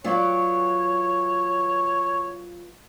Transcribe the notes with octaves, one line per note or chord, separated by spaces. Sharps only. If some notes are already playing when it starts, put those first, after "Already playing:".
F#3 B3 F4 C#5 D5